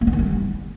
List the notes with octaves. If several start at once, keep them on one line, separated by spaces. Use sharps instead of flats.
A#3
B3
D#3
G3